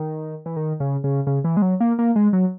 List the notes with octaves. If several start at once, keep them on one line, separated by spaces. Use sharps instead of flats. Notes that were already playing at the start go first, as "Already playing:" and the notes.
Already playing: D#3
E3
D#3
C#3
C#3
C#3
E3
G#3
F#3
A#3
A#3
G#3
F#3